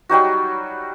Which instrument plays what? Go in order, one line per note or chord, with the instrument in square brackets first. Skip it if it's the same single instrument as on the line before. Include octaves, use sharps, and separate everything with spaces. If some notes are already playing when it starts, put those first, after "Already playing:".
[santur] F#3 G3 D#4 F#4